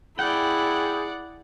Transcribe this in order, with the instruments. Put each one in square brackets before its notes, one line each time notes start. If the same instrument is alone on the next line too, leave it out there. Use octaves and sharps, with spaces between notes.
[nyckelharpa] E4 [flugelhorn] G#4 [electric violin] D5 F#5 [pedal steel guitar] G5